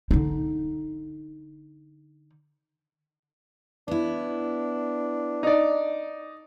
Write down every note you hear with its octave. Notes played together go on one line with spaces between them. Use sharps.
D3 D#4
B3 D4 E4
D#4 D5